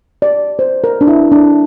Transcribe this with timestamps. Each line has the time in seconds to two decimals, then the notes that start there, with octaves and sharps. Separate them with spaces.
0.22 D5
0.59 C5
0.84 A#4
1.01 D4
1.07 E4
1.32 D4